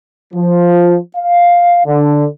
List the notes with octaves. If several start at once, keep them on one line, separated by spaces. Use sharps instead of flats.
F3
F5
D3